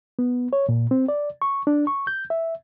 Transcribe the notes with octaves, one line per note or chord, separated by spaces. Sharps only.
B3
C#5
A#2
C4
D5
C#6
D4
C#6
G6
E5